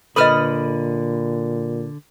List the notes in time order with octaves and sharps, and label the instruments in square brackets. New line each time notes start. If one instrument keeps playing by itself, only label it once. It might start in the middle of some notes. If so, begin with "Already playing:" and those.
[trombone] A#2 [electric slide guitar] D3 [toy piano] A4 B4 D#5 [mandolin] B5 D#6 F6